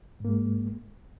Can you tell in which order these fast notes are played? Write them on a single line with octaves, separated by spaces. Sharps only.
G#2 A#3 G#3